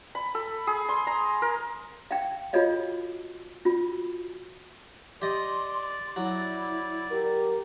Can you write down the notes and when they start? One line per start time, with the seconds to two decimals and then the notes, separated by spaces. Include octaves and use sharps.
0.15 B5
0.35 A4
0.67 G#4
0.89 C6
1.07 A#5
1.42 A#4
2.11 F5 G5
2.53 F4 F#4 A4 C#5 D#5 F5
3.65 F4 F#4
5.22 G4 D5 D#5 C6
6.16 F#3 E4
7.11 G4 A#4